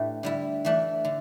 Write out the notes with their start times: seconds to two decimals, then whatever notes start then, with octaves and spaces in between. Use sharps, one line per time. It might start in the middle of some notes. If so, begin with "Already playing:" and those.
Already playing: A2 A3 D4 G4 B4
0.23 D3 G3 E4
0.65 E3 A3 D4
1.05 D3